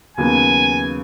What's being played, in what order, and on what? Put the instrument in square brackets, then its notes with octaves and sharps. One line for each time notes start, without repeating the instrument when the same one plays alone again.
[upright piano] D#2 C#3 F#3 B3 [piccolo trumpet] G#5